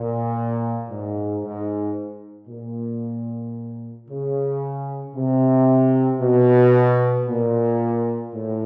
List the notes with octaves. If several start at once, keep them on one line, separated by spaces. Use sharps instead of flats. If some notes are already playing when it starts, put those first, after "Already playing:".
Already playing: A#2
G#2
G#2
A#2
C#3
C3
B2
A#2
A2